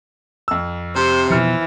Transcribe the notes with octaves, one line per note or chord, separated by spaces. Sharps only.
F2 E6
C3 C5
B2 E3 F3 F6 C#7